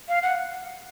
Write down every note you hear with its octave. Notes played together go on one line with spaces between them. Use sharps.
F5
F#5